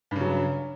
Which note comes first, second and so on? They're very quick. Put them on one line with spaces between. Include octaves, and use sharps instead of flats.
G2 C#3 F#3